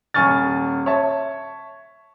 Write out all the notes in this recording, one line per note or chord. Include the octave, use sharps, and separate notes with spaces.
D#1 G#5 C#6 F6 A6
C#5 E5 A5